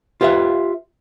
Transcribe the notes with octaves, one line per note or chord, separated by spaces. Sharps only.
F4 G4 B4 D5 E5